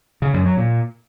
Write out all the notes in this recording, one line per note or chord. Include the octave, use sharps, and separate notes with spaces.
C#3
F#2
F#3
A#2